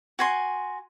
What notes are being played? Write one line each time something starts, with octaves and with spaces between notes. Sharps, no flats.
F#4 G#5 C6